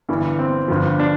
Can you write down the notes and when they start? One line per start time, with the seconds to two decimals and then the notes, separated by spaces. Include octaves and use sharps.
0.09 G1 G2 E3
0.39 C4
0.68 G1 G2 F3
0.99 D4